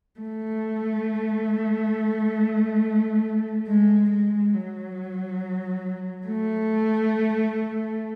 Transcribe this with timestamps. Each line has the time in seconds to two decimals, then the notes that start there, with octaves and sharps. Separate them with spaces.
0.20 A3
3.67 G#3
4.10 G#3
4.54 F#3
6.27 A3